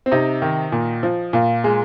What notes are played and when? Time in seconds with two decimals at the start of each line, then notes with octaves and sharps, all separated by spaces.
0.06 C4
0.12 C3 D#4
0.42 D#3
0.72 A#2
1.03 F3
1.33 A#2 F4
1.64 G#3